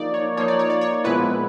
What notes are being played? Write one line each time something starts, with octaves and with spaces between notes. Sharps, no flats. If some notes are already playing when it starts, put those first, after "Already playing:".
Already playing: F3 A#3 D#4 D5
C#5
F3 A#3 D#4 C#5
D5
C#5
D5
C#5
A#2 F3 G#3 B3 E4 B4